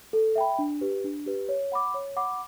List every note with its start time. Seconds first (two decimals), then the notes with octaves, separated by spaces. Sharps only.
0.13 A4
0.36 E5 G5 B5
0.59 D4
0.81 G4 B4
1.04 D4
1.26 G4 B4
1.49 C#5
1.72 F#5 B5 D6
1.94 C#5
2.17 F#5 B5 D6